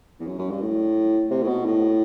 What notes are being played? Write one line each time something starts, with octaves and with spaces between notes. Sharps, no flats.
E2
F#2
F#2
G2
A2
C3
A2
B2
A2